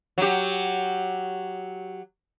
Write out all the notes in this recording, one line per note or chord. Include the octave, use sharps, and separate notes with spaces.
F#3 G4